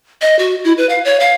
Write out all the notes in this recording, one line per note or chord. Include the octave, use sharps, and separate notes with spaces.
D#5
F#4
E4
B4
F5
C#5
F5